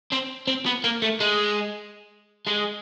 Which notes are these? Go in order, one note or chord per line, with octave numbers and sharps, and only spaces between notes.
C4
C4
B3
A#3
A3
G#3
G#3